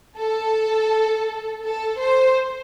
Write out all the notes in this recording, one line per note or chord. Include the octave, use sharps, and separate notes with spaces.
A4
A4
C5